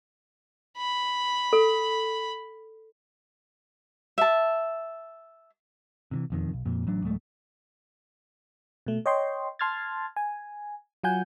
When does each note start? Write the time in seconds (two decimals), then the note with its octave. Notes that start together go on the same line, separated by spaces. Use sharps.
0.77 B5
1.53 A4
4.18 E5 A5
6.11 C3 D#3 E3
6.30 E1 F2 D#3
6.53 B1
6.65 F2 A#2
6.87 A1 F#3 D4
7.02 D1 F#3 G#3 A3
8.86 B2 A3
9.06 C#5 D#5 G5 C6
9.59 A5 C6 F6 G#6 A6
10.16 G#5
11.04 F#3 F4 F#5 G#5 G6